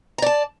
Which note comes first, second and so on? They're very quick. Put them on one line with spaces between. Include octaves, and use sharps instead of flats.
A#5 D5 A5